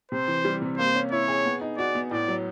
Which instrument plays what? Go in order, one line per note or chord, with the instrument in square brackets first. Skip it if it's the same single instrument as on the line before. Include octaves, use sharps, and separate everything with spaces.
[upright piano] C3 [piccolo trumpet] C5
[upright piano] E3
G3
C3
[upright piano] A#3 [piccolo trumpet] C5
[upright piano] C#4
[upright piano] E4 [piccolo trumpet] C#5
[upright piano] G#4
B3
D#4
[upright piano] F#4 [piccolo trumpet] D5
[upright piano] B3
[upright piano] A2 [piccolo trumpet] D5
[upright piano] F#3